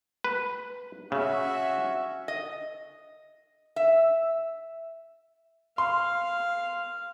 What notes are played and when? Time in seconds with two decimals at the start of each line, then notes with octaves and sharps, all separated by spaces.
0.24 B4
1.12 C#3 C#4 F#4 E5
2.28 D#5
3.76 E5
5.78 F5 C6